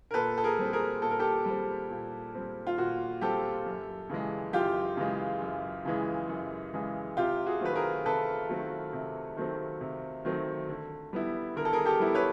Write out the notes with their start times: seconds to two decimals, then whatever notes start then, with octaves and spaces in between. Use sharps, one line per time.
0.11 A#4
0.14 A#2 A4 B4
0.38 A4
0.44 G#4 A#4
0.59 G3 C4
0.73 G#4 A#4
1.02 A#2 A4
1.11 A#4
1.19 G4 A4
1.46 G3 C4
1.91 A#2
2.35 G3 C4
2.67 F4
2.77 A#2 F#4
3.21 G3 C4 G4 A4
3.66 F#2
4.10 C#3 E3 G#3
4.53 F#2 F4 G4
4.97 C#3 E3 G#3
5.42 F#2
5.85 C#3 E3 G#3
6.29 F#2
6.73 C#3 E3 G#3
7.17 C3 F4 G4
7.46 F#4 G#4
7.61 D#3 F#3 A3 C4 B4
7.75 G#4 A#4
8.06 C3 A4 B4
8.49 D#3 F#3 A3 C4
8.93 C3
9.37 D#3 F#3 A3 C4
9.81 C3
10.25 D#3 F#3 A3 C4
10.69 D3
11.13 G3 B3 E4
11.56 D3 A#4
11.65 A4
11.73 G#4 A#4
11.85 G4 A4
12.00 G3 B3 E4
12.15 B4 C#5